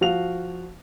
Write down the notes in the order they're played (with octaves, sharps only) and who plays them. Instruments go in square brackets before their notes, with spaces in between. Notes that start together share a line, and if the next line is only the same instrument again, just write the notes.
[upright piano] F3 F#4 F5 F7